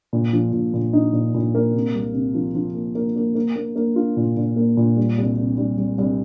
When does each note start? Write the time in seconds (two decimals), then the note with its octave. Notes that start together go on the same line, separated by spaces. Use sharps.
0.13 A#2
0.33 F3
0.53 A#2
0.74 A#2
0.93 D#4
1.13 A#2
1.34 A#2
1.55 A#3
1.74 C3
1.95 C2
2.14 C3
2.35 F3
2.55 F3
2.75 A#3
2.95 A#3
3.16 A#3
3.35 A#3
3.56 A#3
3.76 A#3
3.96 F4
4.17 A#2
4.37 A#2
4.56 A#3
4.77 A#2
4.97 G3
5.18 C2
5.38 C3
5.58 G3
5.78 C2
5.98 C2